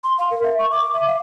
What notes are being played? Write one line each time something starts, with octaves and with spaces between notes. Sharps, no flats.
C6
F5
A#4
E5
C#6
D6
E5
F5